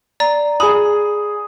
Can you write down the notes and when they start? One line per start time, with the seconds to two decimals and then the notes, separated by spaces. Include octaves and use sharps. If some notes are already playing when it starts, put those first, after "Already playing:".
0.20 D5 A#5
0.60 G#4 B5 D#6